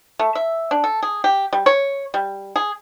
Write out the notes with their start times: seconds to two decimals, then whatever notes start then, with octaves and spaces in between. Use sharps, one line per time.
0.19 A3
0.35 E5
0.71 D4
0.84 A4
1.03 G#4
1.24 G4
1.53 G3
1.66 C#5
2.14 G3
2.56 G#4